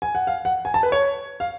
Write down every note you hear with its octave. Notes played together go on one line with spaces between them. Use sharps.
G#5
F#5
F5
F#5
G#5
A5
B4
C#5
F5